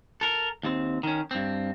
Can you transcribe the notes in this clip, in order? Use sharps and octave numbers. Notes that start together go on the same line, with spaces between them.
A4 A#4
D#2 C4
D#3 C#4
G2 C4